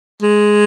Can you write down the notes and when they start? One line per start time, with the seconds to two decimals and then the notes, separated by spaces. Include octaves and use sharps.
0.22 G#3